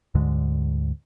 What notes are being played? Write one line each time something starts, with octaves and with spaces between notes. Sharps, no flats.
D2 G#2 D3 G#3